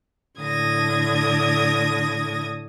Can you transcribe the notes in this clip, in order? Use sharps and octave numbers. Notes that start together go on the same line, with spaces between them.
A2 D3 D#6 G#6 A#6